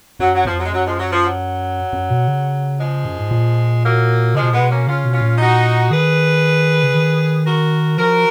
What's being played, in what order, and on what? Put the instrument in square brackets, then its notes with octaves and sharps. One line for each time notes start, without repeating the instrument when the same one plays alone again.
[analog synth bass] F#2 [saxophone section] F#3
[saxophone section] F#3
[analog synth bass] F2 [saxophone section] F3
[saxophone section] F#3
G#3
[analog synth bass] F#2 [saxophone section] F#3
[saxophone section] F3 G#3
F#3
F3
F#3
[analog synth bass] F#2
B2
C#3
[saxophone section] F3 G#3
[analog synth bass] F#2
G#2
A#2
[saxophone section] F#3 A#3
[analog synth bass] C#3 [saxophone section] F3 G#3
[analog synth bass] B2
[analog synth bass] A#2 [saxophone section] G#3 B3
[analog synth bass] B2
[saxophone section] A#3 C#4
[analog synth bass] C#3 [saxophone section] C#4 F4
[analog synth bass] B2
[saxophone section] C#4 F4
[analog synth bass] A#2
[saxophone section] D#4 F#4
[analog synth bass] D#3 [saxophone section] G#4 B4
[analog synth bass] C#3
D#3
[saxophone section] F#4 A#4
[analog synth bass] F3 [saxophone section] F#4 A#4